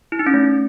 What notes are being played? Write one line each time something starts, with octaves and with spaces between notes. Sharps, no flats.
E4
D#4
C#4
A3